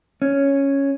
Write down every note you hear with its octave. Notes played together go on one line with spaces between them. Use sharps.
C#4